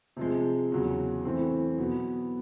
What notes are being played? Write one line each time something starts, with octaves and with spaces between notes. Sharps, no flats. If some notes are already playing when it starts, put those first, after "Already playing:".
C3 F3 G#3
E2 C#3 F#3
E3 A3 C4
B2 F#3 B3